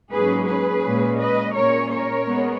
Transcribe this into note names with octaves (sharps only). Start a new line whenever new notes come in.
G#2 F#3 A#3 C#4 G#4 B4
G#4 B4
A#2 G#3 C#4
B4 D#5
A#2 G#3 C#4 A#4 C#5
A#4 C#5
G#3 B3